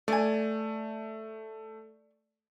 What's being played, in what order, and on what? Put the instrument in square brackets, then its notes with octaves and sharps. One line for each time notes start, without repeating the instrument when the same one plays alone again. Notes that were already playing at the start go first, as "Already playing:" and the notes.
[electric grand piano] A3 [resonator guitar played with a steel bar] D5 G#5